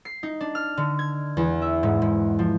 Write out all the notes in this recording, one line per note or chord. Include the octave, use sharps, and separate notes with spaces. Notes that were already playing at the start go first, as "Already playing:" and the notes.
C7
D#4
D4
F6
D3
G#6
E2
E5
G#2
G#2
F3